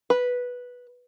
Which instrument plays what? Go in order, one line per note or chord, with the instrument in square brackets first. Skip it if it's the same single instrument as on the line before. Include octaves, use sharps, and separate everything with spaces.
[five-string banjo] B4